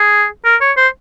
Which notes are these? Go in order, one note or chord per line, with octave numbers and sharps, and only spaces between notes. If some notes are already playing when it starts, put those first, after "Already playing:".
Already playing: G#4
A#4
C#5
C5